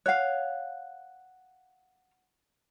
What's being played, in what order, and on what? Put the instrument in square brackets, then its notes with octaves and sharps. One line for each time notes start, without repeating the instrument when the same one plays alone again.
[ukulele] C#5 F5 [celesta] F#5 F#6